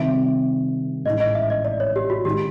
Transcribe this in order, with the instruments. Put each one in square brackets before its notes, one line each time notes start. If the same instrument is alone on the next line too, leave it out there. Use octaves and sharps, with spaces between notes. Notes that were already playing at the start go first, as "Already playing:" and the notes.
Already playing: [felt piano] C2 C3 D#3 G3 C4 [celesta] E5
[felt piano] A1 G#2 E3 A3 C#4 [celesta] D#5
[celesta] D#5
E5
D#5
D5
C#5
G4
F#4
[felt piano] D#3 G#3 C#4 E4 [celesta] G4